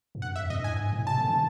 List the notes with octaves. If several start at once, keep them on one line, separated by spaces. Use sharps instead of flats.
G2
F#2 F#5
F2 E5
G2 D#5
A2 G#5
G2
G#2
A2
C3 A5
D3
D#3